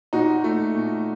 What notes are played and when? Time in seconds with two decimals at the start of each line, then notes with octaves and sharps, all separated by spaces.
0.13 A#2 D#4 F#4
0.44 A3
0.75 A#2